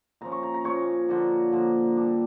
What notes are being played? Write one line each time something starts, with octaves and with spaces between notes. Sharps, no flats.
A#2 F3 C#4 A#5
C#6
A#5
A#5
A#2 F3 C#4 C#5
D3 F3 A#3
D3 F3 A#3
A#2 G3 D4